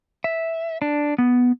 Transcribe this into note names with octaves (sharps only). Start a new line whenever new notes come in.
E5
D4
B3